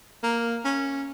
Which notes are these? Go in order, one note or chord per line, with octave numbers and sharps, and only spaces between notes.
A#3
C#4